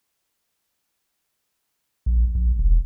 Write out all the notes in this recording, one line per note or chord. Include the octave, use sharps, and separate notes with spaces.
A#1
A#1
E1